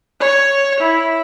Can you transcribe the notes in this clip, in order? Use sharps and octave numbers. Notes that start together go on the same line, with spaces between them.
C#5
E4